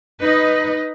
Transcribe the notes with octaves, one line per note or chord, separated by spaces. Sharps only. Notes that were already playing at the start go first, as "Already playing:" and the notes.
D#4 B4 D#5